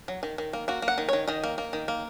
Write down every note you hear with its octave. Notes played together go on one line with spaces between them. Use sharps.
F#3
D#3
D#3
A#3
A#3 F#4
A#3
F#5
D#3
D#3 C#5
D#3 D#5
A#3
A#3
D#3
A#3